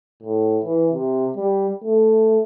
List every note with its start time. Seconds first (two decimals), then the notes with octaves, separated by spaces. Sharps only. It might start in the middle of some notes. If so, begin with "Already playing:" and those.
0.23 A2
0.64 E3
0.93 C3
1.37 G3
1.84 A3